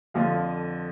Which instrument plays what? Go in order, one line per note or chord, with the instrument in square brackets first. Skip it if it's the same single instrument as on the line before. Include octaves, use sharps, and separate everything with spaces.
[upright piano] F2 D3 F3 F5